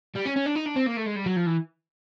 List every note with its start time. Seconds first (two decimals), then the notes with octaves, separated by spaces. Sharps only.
0.16 G3
0.26 C#4
0.36 C#4
0.46 D4
0.55 D#4
0.66 D4
0.76 C4
0.86 A#3
0.97 A3
1.06 G#3
1.16 G3
1.26 F#3
1.36 F3
1.46 E3